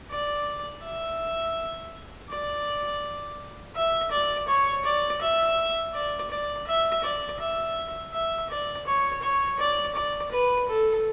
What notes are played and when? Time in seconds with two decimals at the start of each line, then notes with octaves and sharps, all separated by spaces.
0.10 D5
0.84 E5
2.30 D5
3.76 E5
4.11 D5
4.48 C#5
4.85 D5
5.21 E5
5.94 D5
6.31 D5
6.67 E5
7.04 D5
7.40 E5
8.13 E5
8.50 D5
8.87 C#5
9.22 C#5
9.59 D5
9.95 D5
10.32 B4
10.69 A4